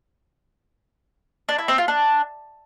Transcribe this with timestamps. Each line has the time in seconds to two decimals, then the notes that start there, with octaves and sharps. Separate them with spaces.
1.49 D4
1.58 E4
1.68 C4
1.78 F4
1.88 D4